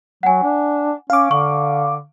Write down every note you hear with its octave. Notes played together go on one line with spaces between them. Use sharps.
F#3 F#5 G#5
D4
C#4 F5 D6
D3 C#6